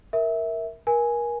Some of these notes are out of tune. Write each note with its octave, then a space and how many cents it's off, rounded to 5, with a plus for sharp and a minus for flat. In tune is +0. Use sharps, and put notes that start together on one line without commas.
A#4 +0 E5 -15
A#4 +35 G#5 +0